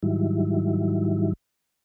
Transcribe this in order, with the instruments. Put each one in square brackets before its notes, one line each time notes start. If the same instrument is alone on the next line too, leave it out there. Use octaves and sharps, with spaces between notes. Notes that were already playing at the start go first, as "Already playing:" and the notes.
[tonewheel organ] G#2 D#3 F#3 G3 E4